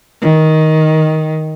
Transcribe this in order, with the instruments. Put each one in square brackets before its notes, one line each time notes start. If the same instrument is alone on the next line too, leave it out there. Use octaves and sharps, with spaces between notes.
[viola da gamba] D#3